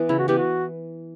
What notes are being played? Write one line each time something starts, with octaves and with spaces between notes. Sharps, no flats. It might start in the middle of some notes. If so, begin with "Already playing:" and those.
Already playing: E3 B3
C#3 E4
F#4
E3 B3 G4
F#4